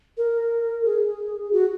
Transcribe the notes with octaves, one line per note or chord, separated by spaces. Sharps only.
A#4
G#4
F#4